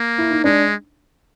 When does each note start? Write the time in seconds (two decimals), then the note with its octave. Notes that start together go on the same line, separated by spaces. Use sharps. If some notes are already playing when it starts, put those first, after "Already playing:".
Already playing: A#3
0.18 E4
0.31 D#4
0.44 G#3 D4